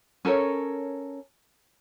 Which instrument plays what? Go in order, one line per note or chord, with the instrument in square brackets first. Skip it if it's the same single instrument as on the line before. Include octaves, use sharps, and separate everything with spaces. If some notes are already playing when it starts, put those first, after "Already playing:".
[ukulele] C#4 A4 A#4 C#5